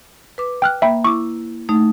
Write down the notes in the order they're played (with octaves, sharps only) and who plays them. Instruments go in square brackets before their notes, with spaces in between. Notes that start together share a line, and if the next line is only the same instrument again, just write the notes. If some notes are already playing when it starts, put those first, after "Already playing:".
[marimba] B4 D6
[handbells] G5 F6 F#6
[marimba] A#3 [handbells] E5 G5 B5
[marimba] E4 [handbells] C#6 D6
[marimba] A3 D#4